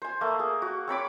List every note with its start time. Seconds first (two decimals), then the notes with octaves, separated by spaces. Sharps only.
0.02 C5 G#5
0.21 A3 A#3
0.39 G#4
0.62 F#4
0.87 C4 C#5 B5 D6